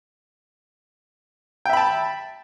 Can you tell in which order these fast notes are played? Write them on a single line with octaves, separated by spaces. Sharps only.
G5 E5 B5 A5